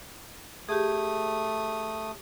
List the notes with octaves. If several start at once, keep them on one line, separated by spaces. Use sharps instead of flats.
A3 G4 G#4 D#6